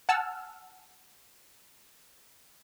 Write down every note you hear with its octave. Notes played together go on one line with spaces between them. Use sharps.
F#5 G#5 A5 E6 F6